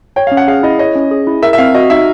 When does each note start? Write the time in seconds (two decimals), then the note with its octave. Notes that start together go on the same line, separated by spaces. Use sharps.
0.16 C#5 G5
0.27 F5
0.32 C#4
0.37 F#5
0.48 G#4 F5
0.63 E4 D#5
0.79 C#5 D#5
0.95 C#4
1.11 G#4
1.27 E4
1.43 A#4 E5
1.53 E5
1.58 C4 F5
1.74 F#4 D#5
1.90 D#4 E5